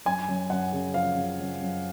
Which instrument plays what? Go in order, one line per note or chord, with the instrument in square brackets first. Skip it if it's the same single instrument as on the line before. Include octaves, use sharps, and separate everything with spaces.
[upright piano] F#2 G#5
F#2
F#2 F#5
C#3
F3 F5
C#3
F#2
F#2